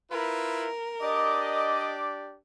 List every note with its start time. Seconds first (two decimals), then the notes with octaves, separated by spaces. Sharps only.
0.11 E4 F4 A#4 B4
1.01 D4 G4 D5 D#5 D6